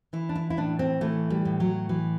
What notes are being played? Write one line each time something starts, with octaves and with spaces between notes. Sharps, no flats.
E3 E4
D4
E4
E4
A2 D4
C4
E3 A3
G3
A2
F#3
E3